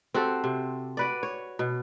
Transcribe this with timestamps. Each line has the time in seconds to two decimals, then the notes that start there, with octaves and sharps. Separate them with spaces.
0.14 C4 F#4 G4 A4
0.44 C3
0.97 F#4 B4 D5
1.23 C#5
1.59 B2